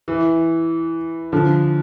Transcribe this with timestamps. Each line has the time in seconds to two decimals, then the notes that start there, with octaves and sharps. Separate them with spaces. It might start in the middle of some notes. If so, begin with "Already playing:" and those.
0.08 E3
1.32 D3 F3